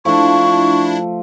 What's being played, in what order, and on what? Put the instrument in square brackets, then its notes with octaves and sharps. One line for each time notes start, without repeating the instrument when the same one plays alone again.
[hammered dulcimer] F3 A3 [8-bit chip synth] D4 E4 [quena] C#6